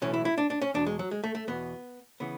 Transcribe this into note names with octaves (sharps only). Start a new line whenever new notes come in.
B1 A2 E3 C#4
E4
E4
D4
D4
C#4
E2 B2 D4
G#3
F#3
G#3
A3
A3
E2 B2 B3
C#3 E3 B3